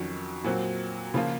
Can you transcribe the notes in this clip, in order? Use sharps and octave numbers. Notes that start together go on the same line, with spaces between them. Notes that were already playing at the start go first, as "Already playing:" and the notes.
Already playing: F2 D#3 F#3 C#4 F#4
A#2 F#3 C4 F#4
C#3 F3 A#3 F4